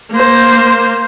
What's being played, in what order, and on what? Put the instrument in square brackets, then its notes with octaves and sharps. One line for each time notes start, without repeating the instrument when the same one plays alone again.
[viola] A#3 C5